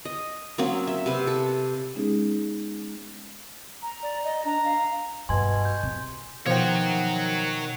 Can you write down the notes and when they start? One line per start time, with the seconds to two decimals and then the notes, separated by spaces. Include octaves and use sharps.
0.05 D#5
0.58 F#3 A#3 C4 C#4
0.87 E5
1.06 C3 B4
1.27 A4
1.95 G#3 B3 C#4 D#4 G#4
3.82 A#5
4.03 D5
4.24 D#5
4.45 D4 A#5
4.64 F5
5.29 G2 B2 G#5 C6 G#6
5.65 G6
5.83 C3
6.46 B2 D#3 F3 C#5 F#5 G5